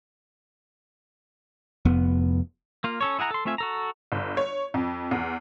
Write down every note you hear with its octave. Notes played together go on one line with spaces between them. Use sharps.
F1 F2 B3
A#3 F4
C#4 A4 C#5
E4 G#4 F#5 A#5
A4 C6
A3 C4 F4 E5 G#5
F#4 A4 A#5
G1
C#5
F2
E2